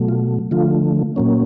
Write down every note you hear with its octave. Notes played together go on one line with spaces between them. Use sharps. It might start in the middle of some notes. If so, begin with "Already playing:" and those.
Already playing: B2 F#3 A3
F4
D3 F3 A3 F4
A#2 F#3 A#3 C#4